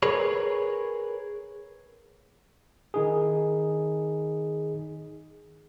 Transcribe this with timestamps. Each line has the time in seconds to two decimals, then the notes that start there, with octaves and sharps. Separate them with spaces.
0.03 G#4 A#4 B4 C#5
2.94 D#3 D#4 G#4